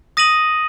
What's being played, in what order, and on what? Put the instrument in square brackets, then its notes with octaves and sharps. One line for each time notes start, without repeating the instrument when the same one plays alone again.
[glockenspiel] D#6 A#6 D#7 F#7